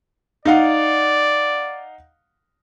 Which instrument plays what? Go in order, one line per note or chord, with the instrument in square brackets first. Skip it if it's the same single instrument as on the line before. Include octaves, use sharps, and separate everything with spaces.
[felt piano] D#4 F5 F#5 [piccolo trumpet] D5